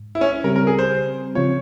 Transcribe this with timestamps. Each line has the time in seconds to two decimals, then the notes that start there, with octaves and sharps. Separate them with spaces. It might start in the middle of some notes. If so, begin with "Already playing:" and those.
Already playing: G#2
0.15 E4
0.21 C#4
0.44 C#3 G3 C4 G4 A#4
0.56 A#4
0.67 G#4
0.79 C5
1.35 C#3 F3 C4 F4 C#5